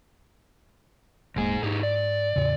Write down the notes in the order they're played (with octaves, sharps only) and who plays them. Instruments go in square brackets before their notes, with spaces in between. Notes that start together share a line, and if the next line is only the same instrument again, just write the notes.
[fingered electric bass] D#1 G#3 A#3 [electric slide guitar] G#2 G#4
[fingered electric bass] G#2 [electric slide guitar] D#4 G4 G#4
[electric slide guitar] D5
[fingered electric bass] E2 A2 C#3